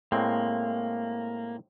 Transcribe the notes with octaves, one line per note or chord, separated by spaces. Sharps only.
A2 G#3 A#3 C4